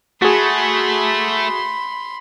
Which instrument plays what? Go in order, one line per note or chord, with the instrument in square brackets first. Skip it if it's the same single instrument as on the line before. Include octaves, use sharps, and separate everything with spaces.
[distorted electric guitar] A3 [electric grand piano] F#4 G#4 [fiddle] B5 C6